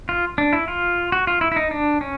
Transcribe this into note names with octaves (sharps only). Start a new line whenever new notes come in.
F4
D4
E4
F4
F#4
F4
E4
E4
D#4
D4
C#4